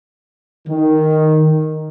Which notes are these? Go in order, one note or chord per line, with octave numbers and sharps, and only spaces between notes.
D#3